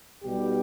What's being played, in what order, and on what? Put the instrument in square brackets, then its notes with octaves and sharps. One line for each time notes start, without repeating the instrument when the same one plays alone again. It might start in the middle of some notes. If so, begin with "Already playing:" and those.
[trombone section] B1 B2 G3 G4